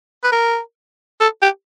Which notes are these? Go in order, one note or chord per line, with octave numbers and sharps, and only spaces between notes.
B4
A#4
A4
G4